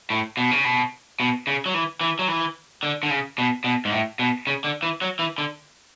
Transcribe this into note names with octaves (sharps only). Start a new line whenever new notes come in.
A2
B2
C#3
B2
B2
C#3
F#3
E3
E3
F#3
E3
D3
D3
C#3
B2
B2
G#2
A2
B2
C#3
D3
E3
F#3
E3
D3